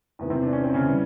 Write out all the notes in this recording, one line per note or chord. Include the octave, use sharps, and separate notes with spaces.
E2 C3 D#3 B3
C3 C4
D4
C#4
C4
C#3 C#4
C#3 E3 G3